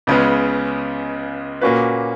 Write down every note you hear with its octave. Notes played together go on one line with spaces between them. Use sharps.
C#2 C#3 G#3 B3
A#2 A#3 C#4 F#4 B4